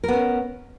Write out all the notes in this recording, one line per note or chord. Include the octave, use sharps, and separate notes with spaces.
B3 C#4 A#4